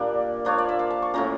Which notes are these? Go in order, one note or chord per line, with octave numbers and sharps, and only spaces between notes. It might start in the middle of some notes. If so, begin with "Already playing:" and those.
Already playing: A#2 G3 A#3 D4
F3 A#3 D4 F4 C#5
D5
E5
F5
A5
C#6
A2 F3 A#3 C#4 A#5